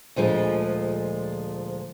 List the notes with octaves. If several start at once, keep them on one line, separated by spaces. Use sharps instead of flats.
D2 A#2 F3 G#3